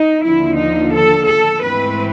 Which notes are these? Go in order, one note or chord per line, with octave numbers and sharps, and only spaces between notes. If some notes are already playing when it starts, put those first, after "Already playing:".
Already playing: D#4
D#2 D3 F3 E4
D#4
A4
A4
G#2 E3 A3 C4 B4